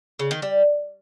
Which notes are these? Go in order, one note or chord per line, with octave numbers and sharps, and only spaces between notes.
C#3
D#3
G3